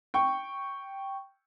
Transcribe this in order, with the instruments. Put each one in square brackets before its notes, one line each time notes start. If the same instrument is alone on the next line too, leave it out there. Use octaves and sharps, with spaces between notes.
[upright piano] G5 C#6